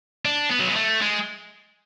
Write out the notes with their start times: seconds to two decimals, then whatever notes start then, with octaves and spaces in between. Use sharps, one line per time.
0.25 D4
0.51 B3
0.60 F#3
0.68 G#3
0.76 A3
1.01 G#3